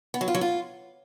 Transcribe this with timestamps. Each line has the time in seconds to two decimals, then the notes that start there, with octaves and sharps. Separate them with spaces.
0.14 B3
0.21 F#3
0.28 F4
0.35 F#3
0.41 F4